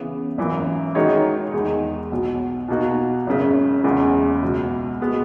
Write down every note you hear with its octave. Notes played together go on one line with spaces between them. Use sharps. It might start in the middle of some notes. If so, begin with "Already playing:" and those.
Already playing: C#3 E3 B3
G#1 F#2 E3 A#3
D#3 G#3 D#4 F#4 C#5
E2 D#3 G#3 D#4
B1 B2 F#3
B2 A#3 D#4 F#4
G#1 F#2 C#3
F#1 E2 C#3 G#3
C#2 B2 F#3
B2 G#3 B3 F#4